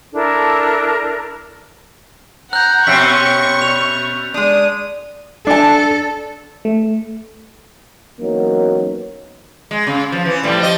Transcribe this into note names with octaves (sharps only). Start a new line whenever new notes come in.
D4 E4 A4 A#4
F#5 A#5 F#6 G6
B2 C4 C#4 C#6 B6
C#5 F7
G#3 D4 D#6
D4 A4 A5
A3
E3 F#3 A#3 B3 C#4 D#4
G#3
C#3
F3
E3 C#4
A2 F3 G3
F3 D#5